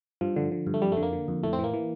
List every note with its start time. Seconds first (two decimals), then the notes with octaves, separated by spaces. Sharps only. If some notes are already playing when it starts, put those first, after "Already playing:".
0.21 G2 F3
0.36 D3
0.52 D3
0.67 G2
0.74 A3
0.82 F2 G3
0.92 D3 A3
1.03 A#3
1.13 D3
1.28 F2
1.43 A2 A3
1.53 C4
1.59 E3
1.64 A#3
1.74 E3